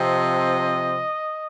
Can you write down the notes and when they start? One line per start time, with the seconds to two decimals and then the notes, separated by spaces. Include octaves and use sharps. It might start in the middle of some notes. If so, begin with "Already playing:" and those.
Already playing: C3 F3 C4 D#5